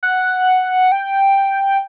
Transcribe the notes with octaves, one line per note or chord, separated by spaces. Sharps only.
F#5
G5